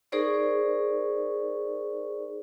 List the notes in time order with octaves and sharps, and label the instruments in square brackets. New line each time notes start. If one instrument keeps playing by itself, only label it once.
[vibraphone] D#4 G#4 A#4 C5 D5 C#6